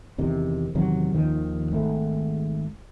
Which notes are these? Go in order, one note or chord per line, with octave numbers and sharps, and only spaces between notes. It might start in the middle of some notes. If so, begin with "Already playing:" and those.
E2 C3 D#3
E2 C3 D#3 F#3
D#2 D#3 F3
G#1 G#2 A3